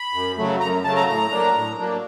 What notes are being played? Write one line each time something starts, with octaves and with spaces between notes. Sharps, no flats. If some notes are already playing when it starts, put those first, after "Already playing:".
Already playing: B5
F#2
C#3 F#3 A3
F#2 A#5
C#3 F#3 A3 A5
A#5
A2 A#5
F#3 A#3 D4
A2
F#3 A#3 D4